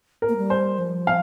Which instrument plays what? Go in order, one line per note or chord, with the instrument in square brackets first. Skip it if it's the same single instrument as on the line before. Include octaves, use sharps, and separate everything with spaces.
[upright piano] A#4
[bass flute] A#3
G3
[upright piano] C5
[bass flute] F3
[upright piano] F5